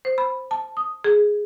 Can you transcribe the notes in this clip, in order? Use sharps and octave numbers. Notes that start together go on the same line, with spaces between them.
C5
B5
A5
D#6
G#4